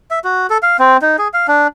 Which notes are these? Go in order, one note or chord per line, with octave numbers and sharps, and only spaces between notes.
E5
F#4
A4
F5
C4
D#4
G#4
F5
D4